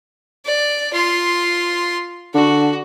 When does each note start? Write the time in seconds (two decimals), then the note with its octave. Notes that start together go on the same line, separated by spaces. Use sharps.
0.46 D5
0.94 F4 C6
2.34 D3 F#4